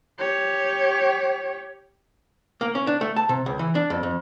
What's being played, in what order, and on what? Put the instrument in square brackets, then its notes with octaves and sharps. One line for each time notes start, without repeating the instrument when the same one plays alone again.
[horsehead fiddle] G4 C#5
[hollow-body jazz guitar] A#3
C#4
D4
A3
A5
C3
C#2
E3
D4
F2
F2